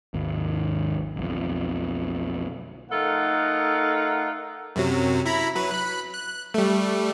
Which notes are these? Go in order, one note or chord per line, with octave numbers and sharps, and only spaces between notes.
G#1 D#2
B1 F2
A3 D#4 F4 A4 A#4 F#5
F#2 C3 F#3
E4 A#5 B5
F#3 B4
B5 F#6
F#6
G3 A3